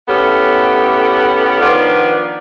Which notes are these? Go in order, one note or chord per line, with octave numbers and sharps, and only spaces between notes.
A2 B3 C#4 G4 A4 F#5
D#3 F3 B3 D4 F4